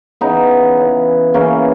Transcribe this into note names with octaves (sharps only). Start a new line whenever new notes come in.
C#3 E3 B3 D#4
C#3 E3
C#3 E3 A#3 C#4